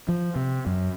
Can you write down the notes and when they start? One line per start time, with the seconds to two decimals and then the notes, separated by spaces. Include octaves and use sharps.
0.09 F3
0.36 C3
0.66 F#2